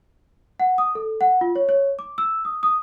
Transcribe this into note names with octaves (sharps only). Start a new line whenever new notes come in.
F#5
D#6
A4
F#5
F4
C#5
C#5
D6
E6
D#6
D#6